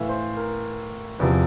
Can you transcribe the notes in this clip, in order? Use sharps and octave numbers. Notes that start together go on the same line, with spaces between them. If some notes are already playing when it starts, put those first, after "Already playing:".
Already playing: A2 E3 E5 F5
C5
A#4
E2 C3 F3